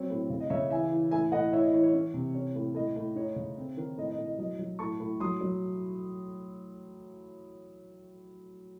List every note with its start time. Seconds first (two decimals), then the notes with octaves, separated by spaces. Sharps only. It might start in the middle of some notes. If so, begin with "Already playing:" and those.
Already playing: F#3 C4 C#5
0.10 A2
0.30 C#3
0.40 D#5
0.50 C#3 C#5 E5
0.70 E3 E5 G#5
0.91 E3
1.11 A2 E5 G#5
1.32 A2 D#5 F#5
1.52 E4 C#5 E5
1.63 D#5
1.73 E3 C#5
1.83 C#5
1.93 C#4
2.14 C3
2.35 C#4
2.55 A2
2.75 A2 D#5
2.96 A2
3.16 D#4 C#5
3.36 C#3
3.57 C4
3.77 D#3
3.97 A2 D#5
4.11 D#5
4.18 A2
4.25 D#5
4.38 F#3 D#5
4.59 F#3
4.79 A2 A5 C#6
5.00 A2
5.20 F#3 C6 D#6
5.41 F#3